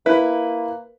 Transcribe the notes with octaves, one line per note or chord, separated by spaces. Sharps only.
A#3 E4 B4